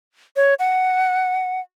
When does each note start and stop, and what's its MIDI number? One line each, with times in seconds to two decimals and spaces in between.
0.36 0.54 73
0.59 1.60 78